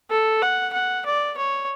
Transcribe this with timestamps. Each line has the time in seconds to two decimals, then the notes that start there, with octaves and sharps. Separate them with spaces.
0.11 A4
0.42 F#5
0.73 F#5
1.06 D5
1.38 C#5